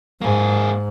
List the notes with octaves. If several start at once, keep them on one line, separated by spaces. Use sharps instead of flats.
G#2 A#3 G#4